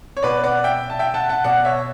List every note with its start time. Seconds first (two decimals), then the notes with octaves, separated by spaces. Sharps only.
0.17 C#5
0.23 B2 B4 D5
0.43 D5 F#5
0.64 E5 G5
0.90 A5
0.99 E5 G5
1.14 F#5 A5
1.29 F#5 A5
1.44 B2 D5 F#5
1.65 C#5 E5